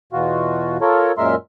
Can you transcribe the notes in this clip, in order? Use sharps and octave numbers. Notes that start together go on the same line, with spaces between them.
E2 B2 F4 F#4
F4 A4 A#4 C#5
F#2 A#2 G#3 A#4 E5 C6